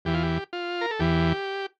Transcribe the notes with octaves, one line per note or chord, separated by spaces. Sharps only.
E2 E3 G4
F4
G4
F4
A#4
A4
E2 E3 G4